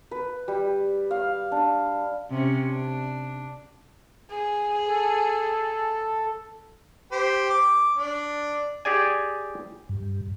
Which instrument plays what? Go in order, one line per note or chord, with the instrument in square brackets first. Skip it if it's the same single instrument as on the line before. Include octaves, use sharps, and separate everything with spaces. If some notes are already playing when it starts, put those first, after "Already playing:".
[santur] B4
G3
F5
D4
[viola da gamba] C3 C#4
D4
[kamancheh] G#4
[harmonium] A4
[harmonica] G4 C5
D6
D4
[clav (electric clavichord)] G4 G#4 D5 G#5
[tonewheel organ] G2